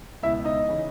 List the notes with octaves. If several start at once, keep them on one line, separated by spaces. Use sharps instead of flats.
C#2 B2 E4 E5
D#4 D#5
C#3 E3